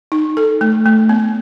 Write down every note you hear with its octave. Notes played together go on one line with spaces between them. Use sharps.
D#4
A4
A3
A3
B3